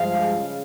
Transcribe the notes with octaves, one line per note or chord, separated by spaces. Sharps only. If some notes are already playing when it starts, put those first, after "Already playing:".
Already playing: G2 F3 G#3 F5
C#3